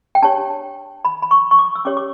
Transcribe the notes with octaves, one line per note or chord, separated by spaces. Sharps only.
G5
D4 G4 C#5 A5
B5
B5
C#6
C#6
D6
E6
C#4 G4 C#5 D6
D6